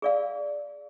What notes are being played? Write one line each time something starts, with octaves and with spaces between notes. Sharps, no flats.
G#4 D5 F5